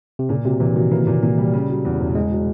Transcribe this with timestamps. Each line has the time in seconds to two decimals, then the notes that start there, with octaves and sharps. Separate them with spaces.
0.19 C3
0.29 A#2 C#3
0.45 C3 F#3
0.60 A#2 E3
0.75 D#3 F#3
0.91 E3 A#3
1.07 A#2
1.23 A#2
1.38 G3
1.53 C#3
1.70 F#3
1.85 E2
2.00 E1
2.15 E1 G#3
2.32 F#3